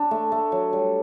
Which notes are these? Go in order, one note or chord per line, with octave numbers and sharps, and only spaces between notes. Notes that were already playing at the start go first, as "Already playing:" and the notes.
Already playing: D4
A3
A3
F#3
G3